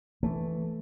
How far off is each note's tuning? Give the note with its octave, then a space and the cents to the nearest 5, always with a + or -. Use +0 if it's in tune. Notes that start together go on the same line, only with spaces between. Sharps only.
E3 +0 A3 +0